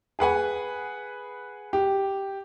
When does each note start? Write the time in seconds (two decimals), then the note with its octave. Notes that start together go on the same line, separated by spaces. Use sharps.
0.19 G#4 B4 F#5 G#5
1.73 G4